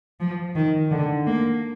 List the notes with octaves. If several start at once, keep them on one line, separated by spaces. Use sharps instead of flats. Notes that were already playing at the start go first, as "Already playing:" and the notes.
F3
D#3
D3
A#3